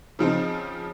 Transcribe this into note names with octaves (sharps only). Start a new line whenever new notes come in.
C#3 F3 C4 D#4